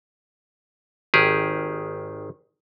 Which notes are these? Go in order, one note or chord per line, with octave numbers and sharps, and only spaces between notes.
G#1 D#3 G4 G#4